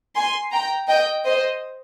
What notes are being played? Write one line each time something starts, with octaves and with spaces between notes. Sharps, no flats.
G#5 C6
G5 A#5
D#5 G5
C5 D#5